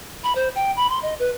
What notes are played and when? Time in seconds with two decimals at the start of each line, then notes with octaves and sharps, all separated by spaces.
0.24 B5
0.35 C5
0.55 G5
0.76 B5
0.89 C6
1.02 D#5
1.19 B4